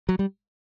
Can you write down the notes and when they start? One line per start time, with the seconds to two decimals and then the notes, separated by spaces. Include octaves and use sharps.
0.09 F#3
0.19 G3